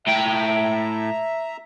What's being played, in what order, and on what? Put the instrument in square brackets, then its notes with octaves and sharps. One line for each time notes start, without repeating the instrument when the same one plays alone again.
[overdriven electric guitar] A2 G5 [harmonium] E5 A#5